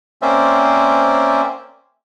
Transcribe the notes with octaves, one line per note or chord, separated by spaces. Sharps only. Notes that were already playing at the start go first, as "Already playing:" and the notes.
A#3 C4 C#4 C5 D5 E5